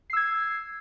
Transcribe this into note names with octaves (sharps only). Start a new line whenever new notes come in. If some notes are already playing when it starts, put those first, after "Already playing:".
E6 G#6 C7